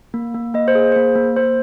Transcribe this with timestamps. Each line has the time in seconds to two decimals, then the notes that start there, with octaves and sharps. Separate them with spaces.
0.14 A#3
0.34 A#3
0.54 A#3 D#5
0.68 C5
0.75 G#4
0.92 A#3 C5
1.16 A#3
1.36 A#3 C5